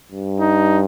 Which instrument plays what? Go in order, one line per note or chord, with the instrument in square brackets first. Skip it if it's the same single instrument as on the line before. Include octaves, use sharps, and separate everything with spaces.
[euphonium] G2
[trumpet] D#4